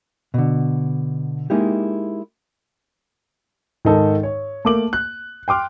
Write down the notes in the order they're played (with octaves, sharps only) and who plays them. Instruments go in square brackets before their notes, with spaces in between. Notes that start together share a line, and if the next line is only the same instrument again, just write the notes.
[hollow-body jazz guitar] B2 D3
G#3 A#3 D#4 E4 G4
[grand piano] G#2 D#3 D#4 A4
C#5
A3 A#3 D6 F#7
F#6
G5 C6 D6 F6